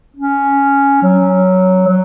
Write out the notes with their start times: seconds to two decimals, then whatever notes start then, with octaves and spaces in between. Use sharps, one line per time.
0.17 C#4
1.03 F#3
1.88 F#3